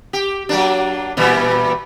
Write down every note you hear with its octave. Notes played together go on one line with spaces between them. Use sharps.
G4
F#3 A#3 D4
A#2 E3 G3